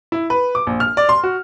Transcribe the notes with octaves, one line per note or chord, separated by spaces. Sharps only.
E4
B4
D6
A#1
F6
D5
C6
F#4